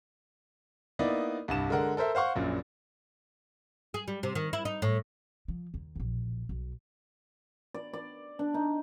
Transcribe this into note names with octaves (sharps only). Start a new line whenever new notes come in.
A#3 B3 D#4 E4 D5 D#5
C2 G2 E7
D3 G#3 A#4 F#5
A4 A#4 C5 E5
C5 F5 F#5 C#6
A#1 F#2 A#2
G#4
G3
C3
D#3
E4
D#4
A2
F3
D#2
E1 A#1
B1
D5
D5
D4
D#4